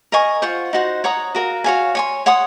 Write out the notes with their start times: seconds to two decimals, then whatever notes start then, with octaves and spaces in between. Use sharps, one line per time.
0.12 A#4 D#5 G#5 C#6
0.42 F4 C5 F#5 C#6
0.73 D#4 F#4 C5 F#5
1.04 C#5 F#5 A#5 D#6
1.35 F#4 A#4 F5
1.64 F#4 C#5 F5 G#5
1.95 C#5 G#5 C6
2.26 C#5 F#5 C6 D#6